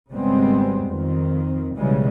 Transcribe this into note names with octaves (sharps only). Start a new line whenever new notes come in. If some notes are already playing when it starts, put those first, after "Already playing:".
G#1 C#3 G3 G#3 B3 C4
F2 D#3 C4
B1 C#3 E3 G3 G#3